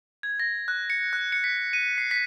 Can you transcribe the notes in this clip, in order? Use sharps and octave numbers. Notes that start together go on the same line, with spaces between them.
G#6
A#6
F#6
C#7
F#6
C#7
B6
D#7
C7
B6